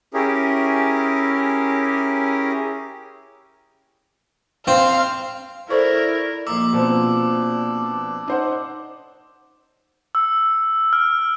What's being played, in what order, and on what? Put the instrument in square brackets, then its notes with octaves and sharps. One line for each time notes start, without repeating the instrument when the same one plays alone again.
[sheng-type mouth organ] C#4 E4 G4 G#4 A#4
[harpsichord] C4 [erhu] F5
[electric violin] E4 A#4 [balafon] A4 C5 C#6 [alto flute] D5
[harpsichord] A#1 A#2 A#3 [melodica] D#4 [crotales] D6 E6
[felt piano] B2 F3 C4 [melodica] D4
[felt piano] D#4 C5 F#5
[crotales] E6
F6